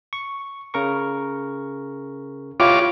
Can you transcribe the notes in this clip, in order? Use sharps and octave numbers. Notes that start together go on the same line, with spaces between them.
C#6
C#3 A#4 C#6
E4 F4 G4 C#5 D6